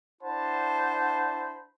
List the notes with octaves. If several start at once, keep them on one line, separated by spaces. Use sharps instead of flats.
D4 E4 C5 F#5 A5 B5